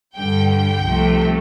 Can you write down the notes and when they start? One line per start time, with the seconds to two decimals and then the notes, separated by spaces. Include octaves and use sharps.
0.16 G2 D3 G3 G5
0.50 G5
0.84 C2 C3 F3 A3